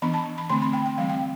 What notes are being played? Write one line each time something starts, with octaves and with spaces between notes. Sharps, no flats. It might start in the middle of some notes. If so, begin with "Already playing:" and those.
E3 B3 D4 B5
A5
B5
D3 A3 C4 C6
B5
G5
G5
E3 G3 C4 F5
G5